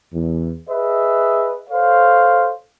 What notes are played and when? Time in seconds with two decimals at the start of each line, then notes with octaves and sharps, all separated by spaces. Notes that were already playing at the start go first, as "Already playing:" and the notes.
0.13 E2
0.68 G#4 B4 D#5 E5
1.70 A4 C5 C#5 F5